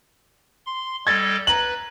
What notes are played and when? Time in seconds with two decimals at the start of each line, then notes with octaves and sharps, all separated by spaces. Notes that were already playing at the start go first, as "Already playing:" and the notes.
0.66 C6
1.07 G3 A4 D#5 G#6 A6
1.47 B4 A#5 F#7